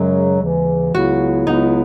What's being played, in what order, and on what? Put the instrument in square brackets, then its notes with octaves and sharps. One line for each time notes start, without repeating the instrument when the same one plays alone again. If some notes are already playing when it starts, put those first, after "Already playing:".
Already playing: [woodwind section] F#2 C#3 F#3 [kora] G#3
[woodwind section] D#2 C#3 E3
[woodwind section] C#2 C#3 F#3 B3 E4 [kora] F#4
[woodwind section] C#2 C#3 F#3 B3 E4 [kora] D#4